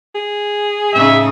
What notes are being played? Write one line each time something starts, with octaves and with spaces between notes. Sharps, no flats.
G#4
A2 C#3 D#4 E5